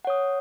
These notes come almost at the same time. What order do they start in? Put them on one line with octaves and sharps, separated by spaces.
F#5 C#5 D#6